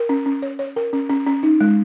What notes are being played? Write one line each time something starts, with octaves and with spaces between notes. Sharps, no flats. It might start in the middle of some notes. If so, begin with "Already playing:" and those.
Already playing: A#4
C#4
C#4
C#5
C#5
A#4
C#4
C#4
C#4
D#4
G#3